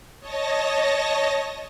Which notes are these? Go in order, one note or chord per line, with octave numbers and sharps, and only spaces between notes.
C#5 D#5 A5 A#6